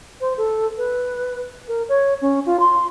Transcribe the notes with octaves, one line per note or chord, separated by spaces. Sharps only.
C5
A4
B4
A#4
C#5
C#4
F4
C6